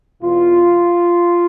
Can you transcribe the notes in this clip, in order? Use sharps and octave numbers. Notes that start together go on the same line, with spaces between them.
E2 B2 F4